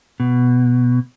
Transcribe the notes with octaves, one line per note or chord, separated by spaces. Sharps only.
B2